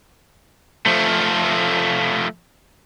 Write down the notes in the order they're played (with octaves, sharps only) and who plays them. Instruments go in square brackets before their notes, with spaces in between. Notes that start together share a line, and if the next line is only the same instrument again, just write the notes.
[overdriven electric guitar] F3 A3